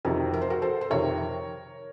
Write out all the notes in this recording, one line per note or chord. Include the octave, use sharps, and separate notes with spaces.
F2 C3 D#3 F#4 A#4
A#4
C5
F#4 A#4
A4 C5
C5
F2 C3 D#3 A#4 C#5